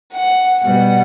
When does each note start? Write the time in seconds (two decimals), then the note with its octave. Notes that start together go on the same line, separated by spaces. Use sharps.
0.12 F#5
0.63 B2 G3 B3 F#5